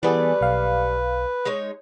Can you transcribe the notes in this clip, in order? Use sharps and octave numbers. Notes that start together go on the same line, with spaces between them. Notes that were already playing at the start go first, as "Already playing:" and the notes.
E3 G3 A3 B3 G#4 B4 D5
B1 F5
G#3 D#4 C#5